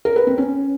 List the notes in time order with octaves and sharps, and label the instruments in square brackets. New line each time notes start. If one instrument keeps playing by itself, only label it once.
[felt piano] A#4
B4
C4
C#4